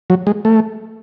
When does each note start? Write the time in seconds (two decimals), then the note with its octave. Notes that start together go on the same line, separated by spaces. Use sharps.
0.10 F#3
0.27 G#3
0.45 A3